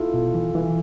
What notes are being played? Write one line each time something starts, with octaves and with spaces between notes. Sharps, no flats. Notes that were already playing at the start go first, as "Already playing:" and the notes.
Already playing: E4 F4 A4
B2
E3
E3